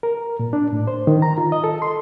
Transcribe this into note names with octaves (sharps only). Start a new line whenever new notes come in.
A#4
A#2
D4
A2
C5
D#3
A#5
F4
D#5
A4
C6